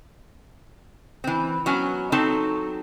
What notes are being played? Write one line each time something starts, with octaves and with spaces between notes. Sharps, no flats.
E3 C4
F#3 B3 C#4 G#5
F#3 C4 D#4 A4 A5